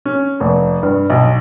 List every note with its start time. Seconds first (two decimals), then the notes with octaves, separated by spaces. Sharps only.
0.05 C#4
0.40 F1
0.83 G2
1.10 B1